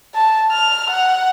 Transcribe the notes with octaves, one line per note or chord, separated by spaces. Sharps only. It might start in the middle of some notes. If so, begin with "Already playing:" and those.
A5
F6
F#5